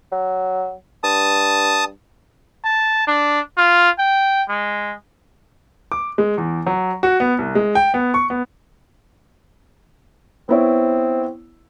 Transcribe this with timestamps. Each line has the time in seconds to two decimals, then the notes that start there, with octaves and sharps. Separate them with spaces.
0.12 F#3
1.04 G2 A5 D#6
2.64 A5
3.07 D4
3.57 F4
3.99 G5
4.49 G#3
5.92 D6
6.18 G#3
6.38 E2
6.66 F#3
7.03 F#4
7.20 B3
7.39 C2
7.55 G#3
7.75 G5
7.94 B3
8.14 C#6
8.30 B3
10.49 B3 C4 E4 C#5